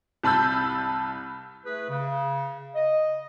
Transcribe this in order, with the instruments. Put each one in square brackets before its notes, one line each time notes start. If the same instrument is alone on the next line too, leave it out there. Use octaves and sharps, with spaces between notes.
[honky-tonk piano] C2 A5 B5 E6 G6
[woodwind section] A3 E4 G#4 B4
C#3
D#5